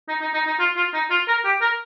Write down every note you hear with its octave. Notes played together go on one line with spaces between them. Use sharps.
D#4
D#4
D#4
D#4
F4
F4
D#4
F4
A#4
G4
A#4